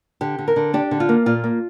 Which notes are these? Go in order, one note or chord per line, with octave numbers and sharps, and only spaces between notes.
D3 G4
D3
A#4
D3
D4 G4
D3
F4
A#3
A#2 F4
A#3